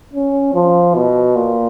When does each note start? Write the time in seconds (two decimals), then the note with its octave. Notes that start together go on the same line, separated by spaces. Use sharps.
0.13 C#4
0.54 F3
0.95 B2
1.36 A#2